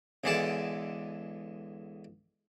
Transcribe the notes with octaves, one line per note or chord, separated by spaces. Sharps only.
B1 D3 E3 G#3 D5 A5